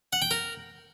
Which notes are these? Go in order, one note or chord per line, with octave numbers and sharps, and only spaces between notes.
F#5
G5
A#4